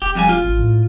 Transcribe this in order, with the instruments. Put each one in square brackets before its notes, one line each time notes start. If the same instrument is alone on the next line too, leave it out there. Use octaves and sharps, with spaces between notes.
[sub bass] E1 [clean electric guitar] G4
[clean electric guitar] F2 G3 G#5
F4
[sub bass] A1
A2